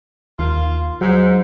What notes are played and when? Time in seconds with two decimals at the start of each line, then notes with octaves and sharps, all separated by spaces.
0.39 D#2 A#3 F4
1.01 G#2 F#3